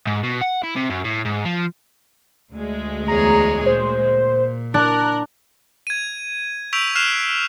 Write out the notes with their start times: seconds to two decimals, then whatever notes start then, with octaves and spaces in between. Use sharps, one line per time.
0.07 G#2
0.23 B2
0.41 F#5
0.63 E4
0.76 C3
0.90 F#2
1.04 A2
1.25 G#2
1.45 F3
2.52 D2 G#3
3.08 E2 G#4 C#5 A#5
3.66 A#2 C5
4.74 D4 A#4 F#6
5.87 G#6 D#7
6.73 C#6 E6 G6 B6 D7 F7
6.95 F6 F#6 C7 E7 F7